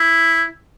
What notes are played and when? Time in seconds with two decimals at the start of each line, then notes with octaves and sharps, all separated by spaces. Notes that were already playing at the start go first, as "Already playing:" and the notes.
Already playing: E4